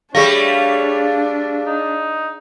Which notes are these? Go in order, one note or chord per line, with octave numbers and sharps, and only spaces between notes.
G3 A3 D4 G#4 C#5 F5
D#4